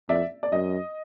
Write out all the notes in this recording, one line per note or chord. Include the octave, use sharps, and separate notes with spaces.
F2 D5 E5
D5
F#2 D#5